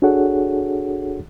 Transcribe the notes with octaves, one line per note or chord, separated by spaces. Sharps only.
D4 F#4 G#4 A4 C#5 F#5